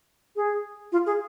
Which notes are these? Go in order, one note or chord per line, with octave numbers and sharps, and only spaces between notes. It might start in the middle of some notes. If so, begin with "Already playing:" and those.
G#4
F4
G#4